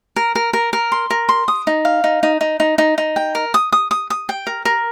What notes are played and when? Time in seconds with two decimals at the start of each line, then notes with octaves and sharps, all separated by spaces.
0.16 A#4
0.35 A#4
0.53 A#4
0.73 A#4
0.92 C6
1.10 A#4
1.29 C6
1.48 D#6
1.67 D#4
1.85 F5
2.04 D#4
2.23 D#4
2.41 D#4
2.60 D#4
2.78 D#4
2.98 D#4
3.16 G5
3.35 A#4
3.54 D#6
3.72 D#6
3.91 D#6
4.10 D#6
4.29 G5
4.47 A#4
4.65 A#4